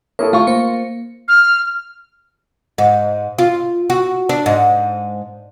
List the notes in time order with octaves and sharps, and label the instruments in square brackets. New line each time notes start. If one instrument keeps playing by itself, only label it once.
[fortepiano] A#3 E4 A4 [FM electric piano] C#5 D#6
[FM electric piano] A3 [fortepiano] F4 C#6
[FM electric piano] A#3 C5 C#7
[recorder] F6
[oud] G#2
F4
F#4
D4
G#2